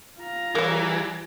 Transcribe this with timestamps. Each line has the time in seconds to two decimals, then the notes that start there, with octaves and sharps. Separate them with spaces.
0.19 F4 A#5
0.55 E3 G3 G#4 A#4 C#5